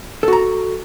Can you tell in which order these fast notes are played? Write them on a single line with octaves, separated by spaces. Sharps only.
A4 F#4 A#5